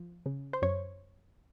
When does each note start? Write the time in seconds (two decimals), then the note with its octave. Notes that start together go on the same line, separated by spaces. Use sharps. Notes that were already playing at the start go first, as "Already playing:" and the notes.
Already playing: F3
0.26 C#3
0.53 C5
0.62 F#2 C#5